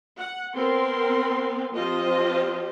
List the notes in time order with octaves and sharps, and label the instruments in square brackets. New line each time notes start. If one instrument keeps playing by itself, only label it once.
[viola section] F#5
B3 C4 A#4 C6
F3 C4 F4 G4 C5 D#5